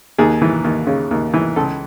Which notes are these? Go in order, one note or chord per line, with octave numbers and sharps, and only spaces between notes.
D#2 G#4
E3
D#2
C#3
D#2
E3
C#2 A4